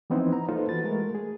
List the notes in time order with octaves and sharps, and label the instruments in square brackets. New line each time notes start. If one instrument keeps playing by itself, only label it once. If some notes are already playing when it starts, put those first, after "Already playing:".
[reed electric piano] E3 F3 B3 C4 D#4 E4
A#5
A#3 D#4 F4 A4 B4 C5
E3 F#4 B4 A6
G#3 A3 A#4
G#4